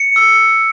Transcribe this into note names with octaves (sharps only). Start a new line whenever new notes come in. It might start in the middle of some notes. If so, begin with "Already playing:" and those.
Already playing: C#7
E6